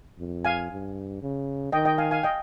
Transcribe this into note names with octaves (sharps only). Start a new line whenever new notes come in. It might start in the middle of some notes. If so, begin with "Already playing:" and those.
F2
F5 G#5
G2
C#3
D#3 D#5 G5
D#5 G5
F5 G#5
F5 G#5
D#5 G5